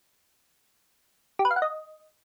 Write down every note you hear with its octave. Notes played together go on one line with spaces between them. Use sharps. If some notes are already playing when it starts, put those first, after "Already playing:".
G4
B4
F5
F#5
D#5